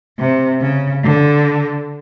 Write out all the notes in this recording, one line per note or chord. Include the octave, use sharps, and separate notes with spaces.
C3
C#3
D3